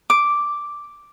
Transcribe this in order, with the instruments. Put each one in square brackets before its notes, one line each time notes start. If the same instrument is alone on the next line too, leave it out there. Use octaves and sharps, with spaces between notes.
[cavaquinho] D6